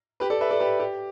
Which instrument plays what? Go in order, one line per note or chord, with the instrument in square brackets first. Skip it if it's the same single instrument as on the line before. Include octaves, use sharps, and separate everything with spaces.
[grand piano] G4 B4
A4 D5
B4 E5
A4 D5
G4 B4
G4